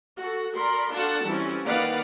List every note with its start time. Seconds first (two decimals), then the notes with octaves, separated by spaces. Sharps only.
0.17 F#4 A4
0.55 A#4 D5 B5 C6
0.92 D4 F4 F#4 A4 F#5 A5
1.26 E3 G3 C4 C#4
1.65 D#3 A#3 B4 D5 F5 F#5